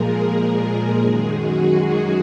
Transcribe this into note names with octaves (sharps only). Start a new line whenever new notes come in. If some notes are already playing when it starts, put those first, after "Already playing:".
Already playing: A#2 F3 G#3 G#4 A#4
A#4
F#2 D#3 G#3 G#4
F#4
F#4